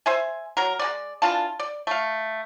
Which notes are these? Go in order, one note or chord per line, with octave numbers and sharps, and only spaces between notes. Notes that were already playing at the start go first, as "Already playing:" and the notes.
C5 E5 G#5
F#3 A#4
G#3 B3 D5
E3 D4 F4 A5
D5
A3 F5